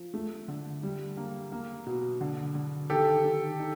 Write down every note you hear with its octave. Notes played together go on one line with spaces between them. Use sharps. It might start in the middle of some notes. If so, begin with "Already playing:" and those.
Already playing: F3
A3
D3
G3
A#3
A#3
B2
D3
D3
D#3 G4 A4
D#3
D#4